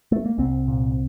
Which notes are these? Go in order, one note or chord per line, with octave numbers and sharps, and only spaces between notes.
A3
A#3
C2 C4
A#2